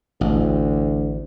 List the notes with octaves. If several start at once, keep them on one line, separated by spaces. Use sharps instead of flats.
A1 D2